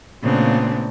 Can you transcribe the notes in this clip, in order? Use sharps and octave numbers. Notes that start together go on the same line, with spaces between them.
A#2 C#3 A3 B3 C4 D4